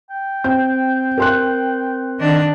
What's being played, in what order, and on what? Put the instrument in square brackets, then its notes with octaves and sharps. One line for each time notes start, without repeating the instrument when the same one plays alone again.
[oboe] G5
[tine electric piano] C4 [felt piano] G6
[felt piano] A#4 C6 F#6
[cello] D#3 D4